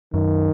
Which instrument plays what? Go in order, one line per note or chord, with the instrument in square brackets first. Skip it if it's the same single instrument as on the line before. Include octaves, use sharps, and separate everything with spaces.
[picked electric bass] F#2 [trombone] D#3